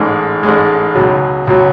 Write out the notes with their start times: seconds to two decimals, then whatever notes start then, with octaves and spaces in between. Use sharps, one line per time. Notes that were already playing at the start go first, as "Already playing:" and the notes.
Already playing: A1 G#2 G#3
0.43 A1 G#2 G#3
0.95 C#2 B2 F#3
1.47 C#2 B2 F#3